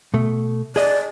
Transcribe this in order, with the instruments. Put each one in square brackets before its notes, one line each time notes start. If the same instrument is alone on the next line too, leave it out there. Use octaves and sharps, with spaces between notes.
[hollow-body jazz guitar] B2 A3
[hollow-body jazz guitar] G#4 D#5 [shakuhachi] D5